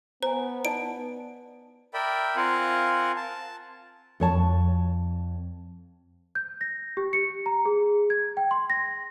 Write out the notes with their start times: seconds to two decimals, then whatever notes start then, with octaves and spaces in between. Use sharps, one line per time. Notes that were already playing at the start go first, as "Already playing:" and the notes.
0.23 B3 C5 G#5 A#5
0.65 D#4 D5 A5 D7
1.94 A#4 D5 E5 G5 B5
2.36 C4 F4 A#4 F5 F#5 G#5
3.16 A5
4.20 F2 C#5 A5
6.35 G6
6.61 A#6
6.97 G4
7.13 C#7
7.46 A#5
7.65 G#4
8.10 G#6
8.37 G5
8.51 C6
8.70 A#6